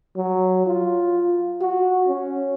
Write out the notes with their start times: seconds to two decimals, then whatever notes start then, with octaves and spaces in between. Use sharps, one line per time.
0.16 F#3
0.66 F4
1.61 F#4
2.08 C#4